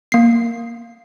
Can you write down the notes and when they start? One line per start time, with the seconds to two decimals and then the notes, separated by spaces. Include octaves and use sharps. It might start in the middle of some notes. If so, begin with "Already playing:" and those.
0.12 A#3 C7